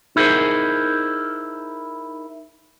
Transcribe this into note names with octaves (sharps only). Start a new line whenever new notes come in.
D#4 E4 G#4 A#4 C5